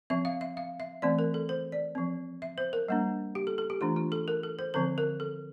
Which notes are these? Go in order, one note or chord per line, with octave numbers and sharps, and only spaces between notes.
F3 C4 E5
F5
E5
F5
E5
E3 A3 C4 D5
A#4
A4
C5
D5
F3 C4
E5
C5
A#4
G3 A#3 D4
G4
A4
A4
G4
E3 A3 D4 F4
F4
A4
A#4
A4
C5
D3 F3 C4 C5
A#4
A4